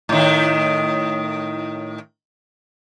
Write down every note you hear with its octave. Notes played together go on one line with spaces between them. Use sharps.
A2 D#3